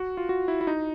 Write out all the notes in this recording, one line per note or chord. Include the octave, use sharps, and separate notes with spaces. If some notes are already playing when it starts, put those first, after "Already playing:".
Already playing: F#4
F4
F#4
E4
E4
D#4